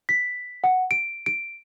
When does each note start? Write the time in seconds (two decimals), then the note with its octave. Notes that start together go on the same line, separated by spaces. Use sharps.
0.09 B6
0.64 F#5
0.91 D7
1.26 D7